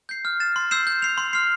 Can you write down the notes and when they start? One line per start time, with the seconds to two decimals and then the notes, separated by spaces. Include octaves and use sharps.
0.09 G6 C7
0.25 F6
0.40 A6 E7
0.56 C6
0.71 E6 G6 C7 E7
0.87 G6
1.02 C7 F7
1.18 C6
1.33 F6 C7